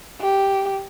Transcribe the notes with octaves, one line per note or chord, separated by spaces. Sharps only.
G4